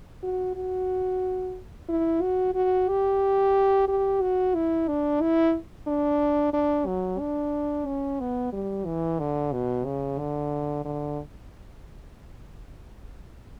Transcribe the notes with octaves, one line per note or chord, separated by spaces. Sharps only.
F#4
F#4
E4
F#4
F#4
G4
G4
F#4
E4
D4
E4
D4
D4
F#3
D4
C#4
B3
G3
E3
D3
B2
C#3
D3
D3